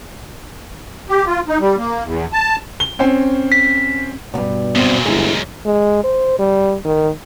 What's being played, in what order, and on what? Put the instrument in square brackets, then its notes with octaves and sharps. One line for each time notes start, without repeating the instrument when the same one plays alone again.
[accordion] G4
F4
D#4
G3
A#3
E2
A5
[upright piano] G7
C4 C#4
[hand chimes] B6
[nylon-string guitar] D2 G2 [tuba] B2
[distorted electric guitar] F#2 A#2 [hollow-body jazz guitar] B3 C4 C5
[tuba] G1 [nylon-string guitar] G#3 [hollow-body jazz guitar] E4 G#4
[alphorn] G#3
C5
G3
D#3